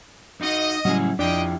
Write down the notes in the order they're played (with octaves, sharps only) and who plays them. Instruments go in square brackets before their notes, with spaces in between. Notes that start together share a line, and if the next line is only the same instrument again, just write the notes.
[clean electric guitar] D#4 F#4 [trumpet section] D#5
[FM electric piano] A2 C#3 G3 [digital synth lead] F#3 [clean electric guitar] C#4 E4 G#4
[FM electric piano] F2 [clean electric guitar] F3 E4 G4 [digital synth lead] D4 [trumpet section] D#5 G5